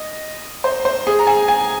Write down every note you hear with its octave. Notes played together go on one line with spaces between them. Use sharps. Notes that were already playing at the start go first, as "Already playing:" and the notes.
Already playing: D#5
C5
C5
G#4
A#5
G#5
G#5